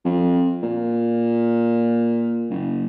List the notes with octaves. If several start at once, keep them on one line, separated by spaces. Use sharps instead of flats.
F2
A#2
F#1